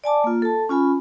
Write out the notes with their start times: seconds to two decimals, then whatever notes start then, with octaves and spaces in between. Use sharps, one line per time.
0.04 D5 G#5 A5 D6
0.24 A#3 F4
0.42 A4 A5
0.69 C#4 F4 G#5 B5